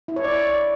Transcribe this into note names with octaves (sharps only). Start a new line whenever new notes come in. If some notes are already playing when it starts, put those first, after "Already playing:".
E4
C#5
D5